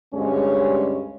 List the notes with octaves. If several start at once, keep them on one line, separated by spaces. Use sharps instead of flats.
D2 G2 G#3 C#4